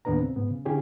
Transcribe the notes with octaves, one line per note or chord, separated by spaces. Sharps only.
D#2 A2 B3 D4 B4 A#5
C#3 C4
G#2 B3
C#3
D3 C#4 E4 G4 G#4 C#5